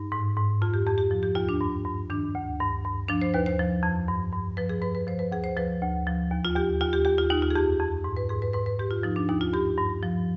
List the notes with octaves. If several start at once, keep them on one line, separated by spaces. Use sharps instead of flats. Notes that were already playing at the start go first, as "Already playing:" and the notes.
Already playing: G2 D#4
G#2
G#2
F2 F4
G4
F2 G4
G4
F3
G4
D#2 F4
D4
G2
G2
D#3 D4
D2
G2
G2
F3 D4
C5
D#2 B4
C5
F3
F2
G2
G2
F3 B4
G#4
G2 B4
B4
F3 C5
B4
D2 G#4
C5
F3 B4
D2
F3
D#2
F4
D#2 G4
D#2 F4
G4
D#2 G4
F4
D#2 D#4
F4
G#4
F2 G4
F2
G#2
B4
G#2 G#4
B4
G#2 B4
B4
G#2 G4
F4
F3 D#4
D4
D#2 D#4
F4
G2 G4
G2
F3